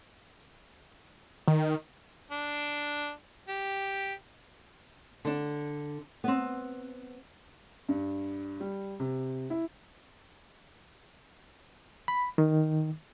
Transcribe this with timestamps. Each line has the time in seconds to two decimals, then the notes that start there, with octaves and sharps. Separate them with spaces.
1.48 D#3
2.31 D4
3.48 G4
5.25 D3 D4
6.24 B3 C4
7.89 G2
8.60 G3
9.00 C3
9.50 E4
12.08 B5
12.38 D#3